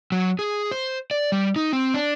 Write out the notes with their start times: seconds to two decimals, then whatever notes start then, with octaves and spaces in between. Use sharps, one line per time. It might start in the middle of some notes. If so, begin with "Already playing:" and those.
0.12 F#3
0.39 G#4
0.71 C5
1.11 D5
1.32 G3
1.56 D#4
1.73 C4
1.94 D4